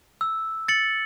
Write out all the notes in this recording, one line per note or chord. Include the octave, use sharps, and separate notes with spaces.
E6
A6 C#7 F#7